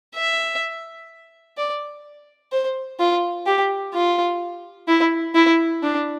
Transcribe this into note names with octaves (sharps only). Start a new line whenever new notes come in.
E5
D5
C5
F4
G4
F4
E4
E4
D4